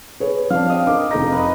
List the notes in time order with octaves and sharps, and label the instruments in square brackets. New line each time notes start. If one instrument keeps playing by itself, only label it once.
[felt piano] G#4 B4 C#5
[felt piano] F3 C4 [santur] D4 F5
[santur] D#5 G5
[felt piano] D4 A#4 D6
[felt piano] F1 G#4 A#6 [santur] D#4
[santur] B4 D#5